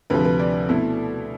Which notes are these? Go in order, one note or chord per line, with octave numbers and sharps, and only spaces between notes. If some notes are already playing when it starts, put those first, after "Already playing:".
D2 C3 F3 B4
B4
D5
B2 A3 E4